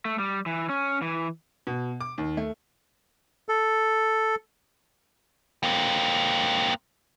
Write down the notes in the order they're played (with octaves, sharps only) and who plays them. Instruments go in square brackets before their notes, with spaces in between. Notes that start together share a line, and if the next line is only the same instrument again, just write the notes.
[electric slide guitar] A3
G3
E3
C#4
E3
[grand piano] B2
D6
D#2
A3
[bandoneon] A4
[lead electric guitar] A#3 C4